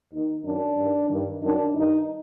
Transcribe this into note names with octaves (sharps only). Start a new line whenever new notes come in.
D#2 D#3 D#4
F#2 D#3 D4
G2 D#3
G2 D#3
F#2 D#3 D4
G2 D#3 D#4